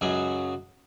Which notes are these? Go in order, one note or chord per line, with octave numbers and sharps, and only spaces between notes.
C#2 F#2 F#3 G#4